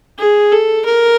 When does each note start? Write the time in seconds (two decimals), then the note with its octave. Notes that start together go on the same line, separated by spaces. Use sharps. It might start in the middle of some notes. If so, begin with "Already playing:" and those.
0.18 G#4
0.52 A4
0.86 A#4